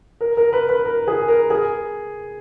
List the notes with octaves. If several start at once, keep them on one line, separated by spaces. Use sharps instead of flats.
A#4
A#4
B4
B4
A#4
G#4
A#4
G#4